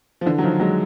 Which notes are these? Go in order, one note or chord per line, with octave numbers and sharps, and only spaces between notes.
F3
D3 E3
F#3
D#3 F3
F#3 G#3